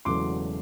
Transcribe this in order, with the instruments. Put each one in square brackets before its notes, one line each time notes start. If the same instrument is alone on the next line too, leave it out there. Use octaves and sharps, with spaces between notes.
[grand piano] E1 E2 C#3 F#3 A3 C6 D6